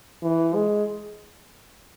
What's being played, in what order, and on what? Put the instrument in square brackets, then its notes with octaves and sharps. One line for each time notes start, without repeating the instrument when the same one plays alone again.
[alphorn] E3
G#3